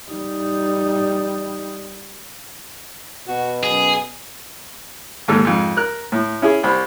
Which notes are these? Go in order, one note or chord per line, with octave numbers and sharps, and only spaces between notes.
G3 D#4
B2 F#4
F#2 G#4
D#2 G#2 A4
F2 G#2
A#4 F#6
A2
C#4 E4 G#4
C2 C5 B5